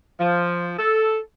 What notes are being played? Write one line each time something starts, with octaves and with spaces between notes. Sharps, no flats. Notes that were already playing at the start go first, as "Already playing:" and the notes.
F3
A4